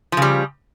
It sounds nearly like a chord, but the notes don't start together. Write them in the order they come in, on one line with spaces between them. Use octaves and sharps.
F3 C#3 G3